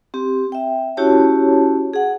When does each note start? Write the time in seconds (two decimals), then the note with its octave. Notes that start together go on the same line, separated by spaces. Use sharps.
0.14 C4 G4
0.52 E5 G5
0.97 C#4 E4 F#4 G4 C#5 A5
1.94 G#4 F#5